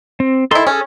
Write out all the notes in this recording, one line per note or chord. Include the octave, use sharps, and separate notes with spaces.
C4
D#3 E4 A4 C6
C#4 G#4 A4